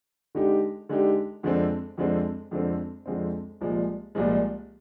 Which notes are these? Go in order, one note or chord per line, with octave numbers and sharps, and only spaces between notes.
D3 G#3 D#4 G4
D3 G#3 D#4 G4
F2 D3 G#3 C4
F2 D3 G#3 C4
F2 D3 G#3 C4
F2 D3 G#3 C4
C2 A#2 F3 G#3
C2 A#2 F3 G#3